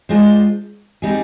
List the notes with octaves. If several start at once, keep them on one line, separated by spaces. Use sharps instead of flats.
G#3 D4 F4 C5 D#5
G3 C4 D#4 G#4